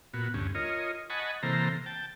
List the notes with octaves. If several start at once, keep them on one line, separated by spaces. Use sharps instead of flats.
A#2 B3 F#4
D2 G2 C#4
F4 A#4 C#5 D#5
D#5 F#5 G#5 A5 B5 C#6
C3 E3 A#3 A4 C5 A#5
G5 A5